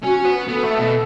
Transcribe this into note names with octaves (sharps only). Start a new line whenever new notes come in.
C#4 F#4
F#4
B3
B3 A4
A3
B2